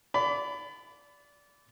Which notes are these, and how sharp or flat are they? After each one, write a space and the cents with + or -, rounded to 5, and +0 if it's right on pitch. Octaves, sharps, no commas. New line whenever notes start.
D5 -20 B5 +25